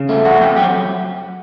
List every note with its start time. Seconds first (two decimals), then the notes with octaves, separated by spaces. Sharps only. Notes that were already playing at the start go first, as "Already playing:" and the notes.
Already playing: C#3
0.09 A3
0.25 F2 F#4
0.41 F2 G4
0.56 F#3 G4